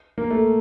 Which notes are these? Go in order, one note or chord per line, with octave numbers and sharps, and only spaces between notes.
A#3
A3